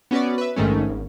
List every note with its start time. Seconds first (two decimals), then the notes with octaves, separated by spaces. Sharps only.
0.11 B3 C#4 F#4 B4 D5
0.38 B4 E5
0.56 A#1 G#2 D#3 A3 C#4
0.89 G#1